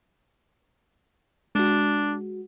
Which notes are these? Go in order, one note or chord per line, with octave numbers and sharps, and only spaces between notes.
G#3 D4 F#4